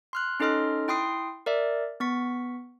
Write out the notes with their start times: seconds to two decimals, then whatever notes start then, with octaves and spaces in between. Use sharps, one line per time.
0.13 C6 F6 F#6
0.40 C#4 D#4 A4 D#5 C6 F6
0.88 E4 G5 C6 D#6 C7
1.46 A#4 D5 E5
2.00 B3 C#6 B6